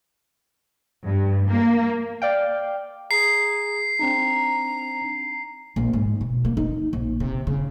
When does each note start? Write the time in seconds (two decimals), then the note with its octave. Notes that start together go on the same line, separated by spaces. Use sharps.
1.06 G2
1.49 A#3
2.22 D5 F5 G5
3.11 G#4 A#5 C7
3.99 C4 D4 D#4 A#5
5.76 A#1
5.93 G#2
6.21 B2
6.45 A#3
6.57 D#4
6.93 A#1
7.20 C3
7.47 C#3